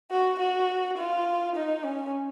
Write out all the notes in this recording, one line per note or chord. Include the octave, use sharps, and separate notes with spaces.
F#4
F#4
F4
D#4
C#4